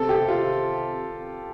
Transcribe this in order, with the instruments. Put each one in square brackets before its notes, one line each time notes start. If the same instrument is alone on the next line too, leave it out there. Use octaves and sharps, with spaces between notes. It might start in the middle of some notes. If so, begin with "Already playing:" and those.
Already playing: [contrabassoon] C3 [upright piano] A4
[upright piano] G4
F4